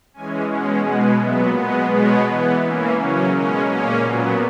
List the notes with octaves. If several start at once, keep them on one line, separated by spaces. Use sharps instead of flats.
E3 G#3 C#4 G#5
B2 G#3 C#4 F#5
B2 G#3 B3 F#5
A#2 F#3 B3 E5
B2 G#3 B3 D#5
B2 G#3 B3 C#5
E3 B3
E3 A#3 C#4
C#3 F#3 C#4
B2 G#3 C#4 A#4
A#2 A#3 C#4 G#4
A#2 F#3 B3 F#4